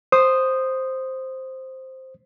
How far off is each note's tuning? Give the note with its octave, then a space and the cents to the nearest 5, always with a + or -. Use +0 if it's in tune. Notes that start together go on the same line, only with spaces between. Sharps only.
C5 +0 D#6 -10